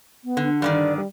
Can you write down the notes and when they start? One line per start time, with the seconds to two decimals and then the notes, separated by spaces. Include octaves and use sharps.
0.24 B3
0.37 D3
0.62 G2 D3 D#3 D5
0.96 G3